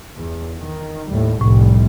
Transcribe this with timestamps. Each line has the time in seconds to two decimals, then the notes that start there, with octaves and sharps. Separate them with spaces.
0.17 E2
0.55 D#3
1.09 D#2 A2 G3
1.41 F1 C2 A2 G3